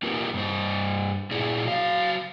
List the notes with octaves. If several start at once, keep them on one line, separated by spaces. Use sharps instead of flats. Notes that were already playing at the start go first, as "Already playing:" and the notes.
A#3 D#4 F4 G4 A#4 B4
G2 C5
A#2 E4 G#4 D5
F#3 F5